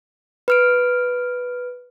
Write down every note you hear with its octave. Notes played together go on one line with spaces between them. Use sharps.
B4 F6 D7